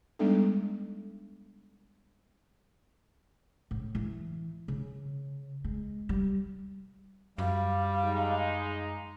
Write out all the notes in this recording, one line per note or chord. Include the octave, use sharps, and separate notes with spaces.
G3 G#3 B3 D4 D#4 A4
A2
E3
C#3
G#3
G3
F#2 G3 F5
G#3 D#4